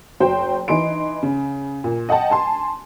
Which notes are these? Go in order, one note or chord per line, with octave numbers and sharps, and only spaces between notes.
F#1 F#4 C5 G5
E3 D#4 C6 D7
C#3
A#2
D#5 F#5 G5 A5
G#5 A5 C6